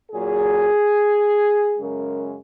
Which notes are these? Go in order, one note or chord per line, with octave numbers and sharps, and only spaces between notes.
A#2 F#3 G#4
F#2 C#3 G#3 A#4